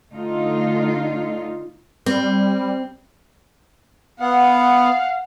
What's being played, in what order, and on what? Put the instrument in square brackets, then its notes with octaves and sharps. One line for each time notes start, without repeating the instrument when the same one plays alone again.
[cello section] D3 A3 D#4 F4
[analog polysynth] G3 [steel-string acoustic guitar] C4
[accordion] B3 [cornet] F5 [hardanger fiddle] F#5